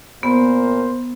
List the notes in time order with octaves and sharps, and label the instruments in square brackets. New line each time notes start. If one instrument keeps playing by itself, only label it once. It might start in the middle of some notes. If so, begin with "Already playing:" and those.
[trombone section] A#2 A#4 C5 [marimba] B3